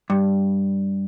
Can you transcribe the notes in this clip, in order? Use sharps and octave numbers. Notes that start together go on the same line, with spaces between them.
G2